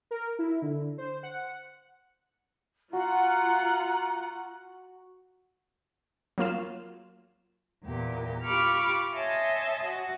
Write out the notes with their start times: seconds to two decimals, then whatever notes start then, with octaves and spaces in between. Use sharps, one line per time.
0.11 A#4
0.39 E4
0.62 D3
0.98 C5
1.23 F#5
2.93 F4 F#4 F#5 A#5
6.38 F#3 A#3 F4 E7
7.83 E2 A#2 G4
8.43 F4 G4 B5 C#6 D6 F6
9.15 C#5 D#5 E5 G#5 A5 C6
9.83 F#4